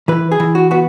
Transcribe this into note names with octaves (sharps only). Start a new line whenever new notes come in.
E3 B4
G#4
E3
F#4
B3 F#4